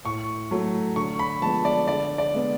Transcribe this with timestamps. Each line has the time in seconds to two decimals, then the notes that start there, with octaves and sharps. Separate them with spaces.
0.05 A2 C#6
0.51 F#3 A3
0.96 D3 C#6
1.19 B5
1.42 F3 G#3 B3 A5
1.65 D5
1.88 D3 D5
2.18 D5
2.34 G#3 B3